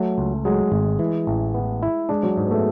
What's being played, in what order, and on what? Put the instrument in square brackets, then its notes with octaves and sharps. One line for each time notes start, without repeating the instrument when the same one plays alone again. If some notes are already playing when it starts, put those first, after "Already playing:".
Already playing: [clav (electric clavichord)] F#3 [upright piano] A3
[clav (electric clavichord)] C#2
[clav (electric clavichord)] F#3 [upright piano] G#3
[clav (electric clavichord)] G#1
E3
A1
B3
E4
[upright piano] G#3 [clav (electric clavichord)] D4
[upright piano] F#3
[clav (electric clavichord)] G#2 [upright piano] G#3
[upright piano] B3
A3